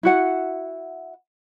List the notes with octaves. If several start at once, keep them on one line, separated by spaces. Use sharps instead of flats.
E4 F#4 F#5